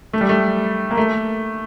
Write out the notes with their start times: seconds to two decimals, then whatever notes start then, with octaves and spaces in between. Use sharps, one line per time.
0.13 A3
0.21 G3
0.29 A3
0.91 A#3
0.97 A3